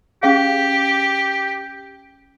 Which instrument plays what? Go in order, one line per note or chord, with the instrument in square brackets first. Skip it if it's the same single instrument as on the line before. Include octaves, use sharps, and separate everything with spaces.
[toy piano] C#4 G#4 F5 [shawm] G4